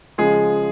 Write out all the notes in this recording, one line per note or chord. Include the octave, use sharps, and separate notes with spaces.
C#3 F3 G#3 G#4